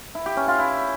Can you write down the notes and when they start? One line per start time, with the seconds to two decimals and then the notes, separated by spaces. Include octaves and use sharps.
0.15 E4
0.26 G4
0.37 C#4
0.48 F4
0.59 E4